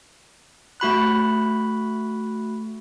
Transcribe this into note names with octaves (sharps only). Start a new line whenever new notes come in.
A3 F#4 B5 F#6